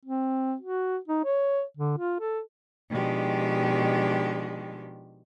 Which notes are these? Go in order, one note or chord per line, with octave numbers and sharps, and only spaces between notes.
C4
F#4
D#4
C#5
D3
F4
A4
B2 D#3 F3 G#3 D4 G4